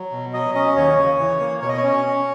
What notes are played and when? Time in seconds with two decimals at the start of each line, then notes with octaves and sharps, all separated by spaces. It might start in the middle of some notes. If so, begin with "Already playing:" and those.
Already playing: F#3
0.12 B2
0.33 F#3 D#5
0.55 C#4 D#5
0.76 D#2 C#5
0.98 C#3
1.19 E3
1.40 A#3
1.62 B2 C#5
1.69 D#5
1.77 C#5
1.83 C#4
2.05 C#4